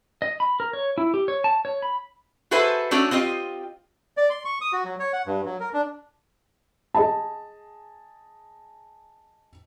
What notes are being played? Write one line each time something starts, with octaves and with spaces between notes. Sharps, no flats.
D#5
B5
A#4
C#5
E4
G4
C#5
A5
C#5
B5
F#4 G#4 A4 B4 C5 E5
A3 C#4 D4 F#4 A4
C4 F4 G4 D#5
D5
C6
C#6
D#6
F#4
F#3
C#5
F#5
G2
F#3
A#4
D4
G#4 D#5 A5